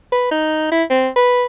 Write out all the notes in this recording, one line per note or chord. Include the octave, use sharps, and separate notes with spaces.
B4
D#4
E4
C4
B4